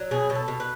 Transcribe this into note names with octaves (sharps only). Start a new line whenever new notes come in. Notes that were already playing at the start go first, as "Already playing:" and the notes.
Already playing: F#3
B2 G#4
B2
A4
B2
B4